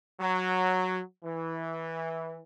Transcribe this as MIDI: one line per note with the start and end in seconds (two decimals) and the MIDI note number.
0.20 1.01 54
1.24 2.39 52